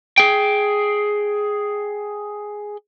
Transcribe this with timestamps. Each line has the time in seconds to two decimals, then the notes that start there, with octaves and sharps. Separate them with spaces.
0.18 G#4 G5